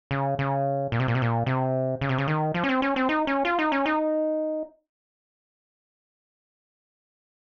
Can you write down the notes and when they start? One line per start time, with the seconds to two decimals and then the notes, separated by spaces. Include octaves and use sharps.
0.11 C#3
0.39 C#3
0.92 A#2
1.00 C3
1.08 A#2
1.15 C3
1.22 A#2
1.46 C3
2.01 C#3
2.09 C3
2.18 C#3
2.28 D#3
2.54 F3
2.64 C#4
2.69 C4
2.82 C#4
2.96 C4
3.09 D#4
3.27 C#4
3.45 F4
3.59 D#4
3.72 C#4
3.86 D#4